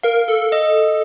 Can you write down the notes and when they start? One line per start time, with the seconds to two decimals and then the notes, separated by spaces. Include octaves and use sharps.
0.03 A#4 F5
0.28 A4
0.52 D#5